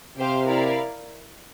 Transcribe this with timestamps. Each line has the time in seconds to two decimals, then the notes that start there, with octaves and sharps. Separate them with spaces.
0.17 C3 G4 C5 F5
0.47 E4 A#4 D5 F5